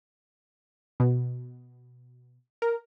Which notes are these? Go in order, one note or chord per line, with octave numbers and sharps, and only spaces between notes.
B2
A#4